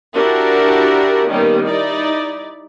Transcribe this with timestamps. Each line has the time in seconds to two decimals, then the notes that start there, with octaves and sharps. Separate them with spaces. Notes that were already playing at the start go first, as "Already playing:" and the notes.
0.14 D4 E4 F#4 G4 A#4
1.28 D#3 G3 A#3 B3 C#4
1.63 D#4 E4 D5